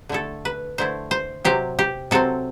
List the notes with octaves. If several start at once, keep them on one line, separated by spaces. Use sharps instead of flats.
D3 A3 E4 A4
B4
D3 A3 E4 C5
C5
C3 F#3 C4 G4
G4
C3 F#3 C4 A4